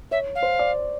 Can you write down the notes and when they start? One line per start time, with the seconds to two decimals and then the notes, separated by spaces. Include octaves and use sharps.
0.11 C#5 E5
0.35 F5
0.42 C5
0.59 D5